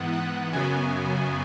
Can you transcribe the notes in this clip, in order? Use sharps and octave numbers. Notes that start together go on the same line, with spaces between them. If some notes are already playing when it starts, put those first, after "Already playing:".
Already playing: G#2 E3 B3 F#5
F#5
F#2 C#3 F#3 B3 G#5